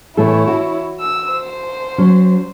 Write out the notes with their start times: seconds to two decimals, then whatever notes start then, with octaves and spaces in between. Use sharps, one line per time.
0.17 A2 E3 E4 A4 C#5
0.47 F#4
1.00 E6
1.31 C5
1.98 F#3 C#4